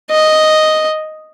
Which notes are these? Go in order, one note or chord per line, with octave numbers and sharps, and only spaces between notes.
D#5